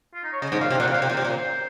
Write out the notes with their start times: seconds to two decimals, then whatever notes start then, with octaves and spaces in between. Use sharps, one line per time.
0.14 F4
0.24 D#4
0.33 C#5
0.42 C#3 D#5
0.52 G#2
0.61 A#2 F5
0.70 C3
0.80 A#2 F#5
0.88 C3
0.92 A#2 F5
1.02 C3
1.06 A#2 C5
1.17 C3
1.25 A#2